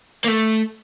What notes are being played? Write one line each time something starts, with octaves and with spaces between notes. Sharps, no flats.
A#3
A3